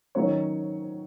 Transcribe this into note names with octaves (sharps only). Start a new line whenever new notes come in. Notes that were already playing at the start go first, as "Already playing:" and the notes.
D#3 F#3 C#4 C#5